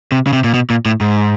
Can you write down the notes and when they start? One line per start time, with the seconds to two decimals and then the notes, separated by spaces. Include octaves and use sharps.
0.12 C3
0.27 C#3
0.33 C3
0.44 A#2
0.54 B2
0.70 A#2
0.86 A2
1.01 G#2